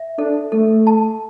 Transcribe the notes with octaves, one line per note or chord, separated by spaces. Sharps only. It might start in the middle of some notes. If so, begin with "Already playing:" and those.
Already playing: E5
D4 A4
A3 A4
A5